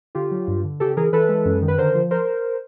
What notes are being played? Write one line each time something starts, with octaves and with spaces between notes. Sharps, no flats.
D3 F4 G4
F#3
G2
D3
C#3 G4 A4
E3 G#4 A#4
E3 A4 B4
G#3
F#2
D#3
B4
D3 A#4 C5
F3
A#4 C5